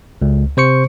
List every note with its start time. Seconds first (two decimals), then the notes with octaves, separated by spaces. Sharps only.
0.22 C#2
0.57 C3 C5 C#6 C#7